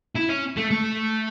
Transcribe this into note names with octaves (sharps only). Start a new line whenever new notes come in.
E4
C#4
A3
A3